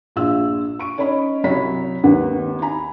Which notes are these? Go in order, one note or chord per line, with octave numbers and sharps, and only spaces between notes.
A#1 F4 E6
C#6 D7
C#4 D#4 C#5 D#5 B5
C2 F#3 C#5 B5 B6
G#1 D#2 D#3 B3 F#5
G#5 A#5 B5